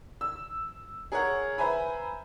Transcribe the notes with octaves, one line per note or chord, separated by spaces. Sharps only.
E6
G#4 A#4 C#5 F#5
B4 C5 E5 G#5 A#5 B5